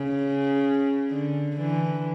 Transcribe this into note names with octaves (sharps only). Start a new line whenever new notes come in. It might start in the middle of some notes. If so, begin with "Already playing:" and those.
Already playing: C#3
D3
D3 E3